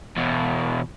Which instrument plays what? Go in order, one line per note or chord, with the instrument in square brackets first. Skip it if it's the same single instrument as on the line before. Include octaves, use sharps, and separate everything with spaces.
[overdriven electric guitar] E2 B2